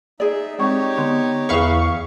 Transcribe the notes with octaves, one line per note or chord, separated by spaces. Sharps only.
D#4 G#4 D5 E5
G#3 C4 D#4 G4 C#5 C#6
D3 B3 C6
E2 G#4 B4 E5 F5 C#6